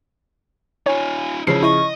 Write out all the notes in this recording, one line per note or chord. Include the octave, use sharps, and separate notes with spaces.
D#4 F4 C#5 G#5
C#3 F3 D#4 E4 C#5 C7
E4 D#5 C#6